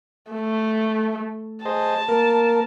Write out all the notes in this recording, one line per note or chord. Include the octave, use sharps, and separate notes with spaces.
A3
G#4 C5 D#5 A5
A#3 A#4